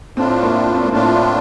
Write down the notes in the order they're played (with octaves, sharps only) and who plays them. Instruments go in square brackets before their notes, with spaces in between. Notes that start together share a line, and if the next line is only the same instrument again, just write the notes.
[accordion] A2 A3 D4 F4 [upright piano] C4
[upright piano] A#3
C4
A#3
[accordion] A2 A3 D4 F4 [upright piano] C4